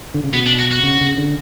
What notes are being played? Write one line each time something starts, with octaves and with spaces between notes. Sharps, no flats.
D3
C#3
B2 B3
D4
F#4
F#4
C#3
C#3
D3